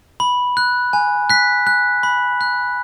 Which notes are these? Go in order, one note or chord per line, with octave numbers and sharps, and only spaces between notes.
B5
F#6
G#5
F#6 B6
F#6
B5
F#6